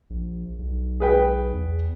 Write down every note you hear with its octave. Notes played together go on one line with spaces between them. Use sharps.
A#1
B1
G#4 B4 G5
E2